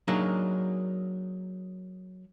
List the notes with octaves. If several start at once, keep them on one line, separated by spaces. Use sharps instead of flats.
F#3 A#3 D4 D#4 G#4 A#4